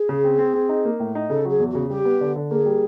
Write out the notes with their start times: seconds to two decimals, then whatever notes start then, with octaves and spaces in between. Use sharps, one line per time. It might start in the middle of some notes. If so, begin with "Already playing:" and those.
Already playing: G#4
0.09 C#3
0.24 C4
0.39 C4
0.54 C4
0.69 D#4
0.85 A#3
1.00 A2
1.15 D#4
1.30 C#3 A4
1.45 F#3 G#4
1.60 E2
1.70 C#3 F#4
1.90 G3 G4
2.05 B3
2.21 D3
2.36 D3
2.51 A#3 G#4
2.65 G3